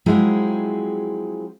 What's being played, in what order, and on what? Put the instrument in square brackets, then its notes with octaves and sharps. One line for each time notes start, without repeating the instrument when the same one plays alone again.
[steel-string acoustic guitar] F3 F#3 G#3 C4 E4 G#4